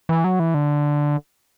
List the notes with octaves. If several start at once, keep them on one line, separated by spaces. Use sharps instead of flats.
E3
F#3
E3
D3